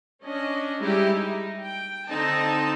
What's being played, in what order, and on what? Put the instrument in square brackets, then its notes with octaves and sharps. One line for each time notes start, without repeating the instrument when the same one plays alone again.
[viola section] C#4 D4 D#5
G3 G#3 D#4 E4 G4
D#4
G5
D3 C4 D#4 A5